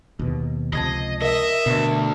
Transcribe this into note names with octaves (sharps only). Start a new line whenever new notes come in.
D#2 B2
C#2 C3 F3 D#5 A5 G#6 C7
A#4 D#5 E5
D2 B2